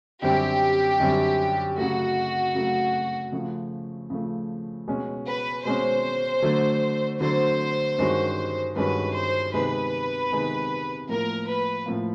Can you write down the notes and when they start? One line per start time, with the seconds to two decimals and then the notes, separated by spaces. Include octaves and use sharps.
0.22 F#2 D3 G3 C4 G4
1.00 F#2 D3 G3 C4
1.77 C#3 F#3 A3 F#4
2.55 C#3 F#3 A3
3.32 C#3 F3 A3
4.10 C#3 F3 A3
4.87 B2 G#3 C#4
5.26 B4
5.65 B2 G#3 C#4 C5
6.42 D3 F#3 A3
7.20 D3 F#3 A3 C5
7.98 G2 D#3 G#3 C#4 F#4
8.75 G2 D#3 G#3 C#4 F#4 B4
9.14 C5
9.53 C3 D#3 G#3 B3 D#4 B4
10.31 C3 D#3 G#3 B3 D#4
11.08 A2 F3 A#3 A#4
11.47 B4
11.86 A2 F3 A#3